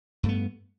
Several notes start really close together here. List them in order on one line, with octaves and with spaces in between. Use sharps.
G2 A3 B3